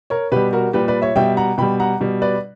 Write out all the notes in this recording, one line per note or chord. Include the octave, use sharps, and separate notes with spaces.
A#4 C#5
B2 G3 G4 B4
F#4 A#4
A#2 G3 G4 B4
B4 D5
C#5 E5
B2 G3 E5 G5
F#5 A#5
B2 G3 G5 B5
F#5 A#5
B2 G3
B4 D5